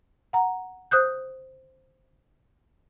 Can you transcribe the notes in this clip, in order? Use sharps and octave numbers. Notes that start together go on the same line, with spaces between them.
F#5 A#5
C5 D#6 F#6 G6